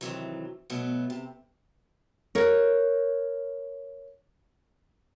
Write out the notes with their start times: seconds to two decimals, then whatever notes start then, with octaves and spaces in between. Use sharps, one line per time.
0.01 C3 D#3 E3 F#3
0.70 B2 F#3 A3 B3
1.10 C3
2.35 A#4 C#5